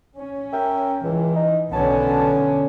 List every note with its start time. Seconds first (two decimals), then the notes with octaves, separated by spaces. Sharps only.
0.14 C#4
0.52 A#4 E5 G5
1.04 C#2 E3
1.35 D#4
1.72 B1 D3 F#3 B3 C#4 A5